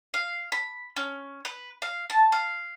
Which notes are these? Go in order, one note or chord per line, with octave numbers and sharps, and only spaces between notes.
F5
B5
C#4
B4
F5
A5
F5